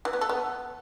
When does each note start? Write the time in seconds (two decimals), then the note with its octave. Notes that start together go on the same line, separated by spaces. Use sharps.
0.05 E3
0.13 B3
0.21 A4
0.29 B3